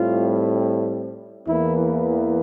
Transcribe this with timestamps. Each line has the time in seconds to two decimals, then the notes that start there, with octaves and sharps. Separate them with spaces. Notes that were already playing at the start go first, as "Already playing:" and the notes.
Already playing: A2 G3 C4 F4
1.47 E2 E3 A#3 E4